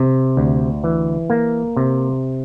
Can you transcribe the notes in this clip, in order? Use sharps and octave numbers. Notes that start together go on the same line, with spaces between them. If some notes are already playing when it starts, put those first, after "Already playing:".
Already playing: C3
D2
E3
A#3
C3